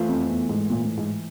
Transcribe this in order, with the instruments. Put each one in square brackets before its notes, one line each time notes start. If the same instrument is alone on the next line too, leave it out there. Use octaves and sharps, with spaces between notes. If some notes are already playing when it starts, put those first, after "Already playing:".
Already playing: [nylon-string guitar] E3 A3 C4 F4
[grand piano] F2
E2
G#2
A#2
A2
G#2